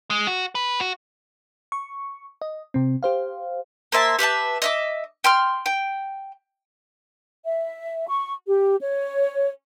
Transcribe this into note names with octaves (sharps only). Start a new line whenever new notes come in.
G#3
F#4
B4
F#4
C#6
D#5
C3 C4
G4 C5 F5
A#3 C5 E5 A5
G4 B4 E5 A5
D#5 E5 D6
G5 C6 F6
G5
E5
C#6
G4
C#5